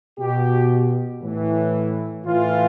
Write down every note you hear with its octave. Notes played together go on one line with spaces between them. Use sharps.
B2 G4
A2 E3
A2 E3 F4